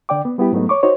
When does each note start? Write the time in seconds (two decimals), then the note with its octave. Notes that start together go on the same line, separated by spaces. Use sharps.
0.09 D3 D5 G5 D6
0.25 B3
0.38 G3 B3 E4 G4
0.52 G#2 F#3 A3 B3 D#4
0.69 C#5 C#6 D6
0.83 D#4 F#4 C5 C#5